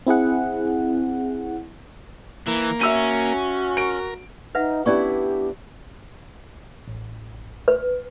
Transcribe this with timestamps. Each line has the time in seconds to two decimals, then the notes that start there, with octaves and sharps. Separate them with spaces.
0.07 C4 E4 G#4 F#5
2.47 E3 A#3
2.81 C#4 F#4 E5 E6 D#7
3.77 A#4 D7
4.55 D#4 B4 E5 F#5
4.86 B3 C#4 D4 E4 G4 D5 C#6
6.88 A1
7.68 B4